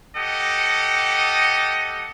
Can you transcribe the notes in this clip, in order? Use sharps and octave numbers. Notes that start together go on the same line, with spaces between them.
G4 A4 D#5 F#5